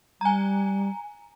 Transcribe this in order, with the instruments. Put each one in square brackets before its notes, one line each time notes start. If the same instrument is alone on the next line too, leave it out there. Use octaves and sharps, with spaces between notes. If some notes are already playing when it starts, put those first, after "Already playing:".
[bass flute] G3 [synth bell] G#5 A#5